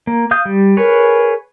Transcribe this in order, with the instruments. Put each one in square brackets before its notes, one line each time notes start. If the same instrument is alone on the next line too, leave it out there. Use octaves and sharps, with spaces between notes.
[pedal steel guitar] A#3
F5 D#6 G6
G3
[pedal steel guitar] G#4 B4 C#5 [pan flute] A#4